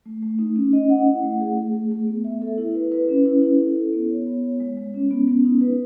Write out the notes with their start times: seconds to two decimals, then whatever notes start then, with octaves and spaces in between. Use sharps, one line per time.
0.06 A3
0.22 A3
0.39 D#4
0.56 C#4
0.73 D#5
0.90 F#5
1.07 E4
1.23 A3
1.40 G#4
1.57 A3
1.74 A3
1.91 A3
2.07 B3
2.24 E5
2.42 A4
2.58 E4
2.75 B4
2.92 B4
3.09 C#4
3.25 E4
3.42 E4
3.59 A4
3.76 A4
3.93 B3
4.10 C#5
4.27 B3
4.44 C#5
4.60 G#3
4.77 G#3
4.94 C#4
5.11 B3
5.28 B3
5.45 D#4
5.61 B4